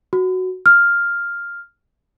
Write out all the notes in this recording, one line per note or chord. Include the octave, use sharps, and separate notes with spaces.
F#4
F6